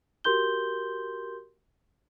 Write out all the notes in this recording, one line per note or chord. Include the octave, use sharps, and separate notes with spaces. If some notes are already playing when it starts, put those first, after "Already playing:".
F#4 G4 A#4 C6 G6 G7